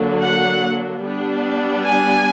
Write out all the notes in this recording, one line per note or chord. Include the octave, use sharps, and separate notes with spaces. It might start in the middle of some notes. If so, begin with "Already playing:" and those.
Already playing: D3 F#3 A#3 D4
F#5
G3 B3 D4
G#5